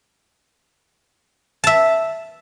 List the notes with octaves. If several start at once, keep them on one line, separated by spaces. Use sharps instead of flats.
E5 A5